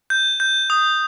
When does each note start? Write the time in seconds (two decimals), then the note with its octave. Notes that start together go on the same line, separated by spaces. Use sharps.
0.10 G6
0.40 G6
0.70 D#6